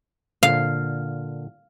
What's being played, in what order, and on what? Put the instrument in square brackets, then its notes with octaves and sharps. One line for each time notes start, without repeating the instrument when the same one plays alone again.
[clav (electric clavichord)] A#2 D3 [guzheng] F5